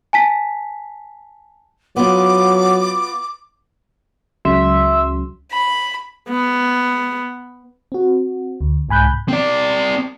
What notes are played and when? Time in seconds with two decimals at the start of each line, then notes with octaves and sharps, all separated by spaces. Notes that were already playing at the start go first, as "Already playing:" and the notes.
0.13 G#5 A5 B6
1.97 F#3 B3 F4 D6
4.45 C#2 C#3 F#3 E5 C6
5.52 B5
6.30 B3
7.92 C4 F#4
8.61 D2
8.89 C2 G#2 G#5 B5 F#6 G6
9.28 C4 D5